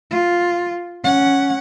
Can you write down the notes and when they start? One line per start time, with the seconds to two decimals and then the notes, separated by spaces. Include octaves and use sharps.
0.11 F4
1.03 C#4 F#5